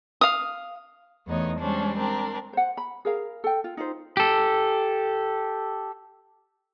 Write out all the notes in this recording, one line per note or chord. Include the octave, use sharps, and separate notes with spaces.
F5 D#6
E2 E3 A3 B3 D#4 C#5
G3 G#3 C#4 D4 C5
C4 D4 A#4
C5 F#5
B5
G#4 A#4 F5
A4 G5
F4
D#4 F4 C5
G4 A4